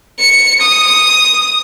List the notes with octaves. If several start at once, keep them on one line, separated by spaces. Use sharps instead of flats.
C#7
D#6